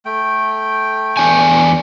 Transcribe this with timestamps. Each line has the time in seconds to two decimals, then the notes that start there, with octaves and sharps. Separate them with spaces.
0.05 A3 G5
1.17 E2 D4 G#5